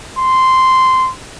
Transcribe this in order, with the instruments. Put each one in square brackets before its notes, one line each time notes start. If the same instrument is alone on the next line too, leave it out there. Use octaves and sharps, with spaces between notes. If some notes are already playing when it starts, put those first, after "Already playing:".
[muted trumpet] C6